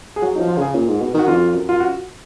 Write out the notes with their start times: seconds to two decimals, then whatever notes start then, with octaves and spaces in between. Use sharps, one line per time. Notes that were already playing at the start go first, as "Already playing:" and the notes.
0.16 G#4
0.22 F#3 F#4
0.36 D#4
0.40 F3
0.48 F4
0.57 C#3 G#4
0.75 A#2
0.89 G#2
1.01 B2
1.14 D#3 F#4
1.28 F2 F4
1.55 F#2
1.69 F4
1.80 F#4